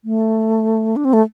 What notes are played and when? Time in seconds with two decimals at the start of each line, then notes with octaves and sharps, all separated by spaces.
0.05 A3
0.96 D4
1.05 C4
1.13 A3